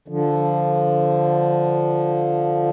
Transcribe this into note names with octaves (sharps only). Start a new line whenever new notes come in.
D3 F3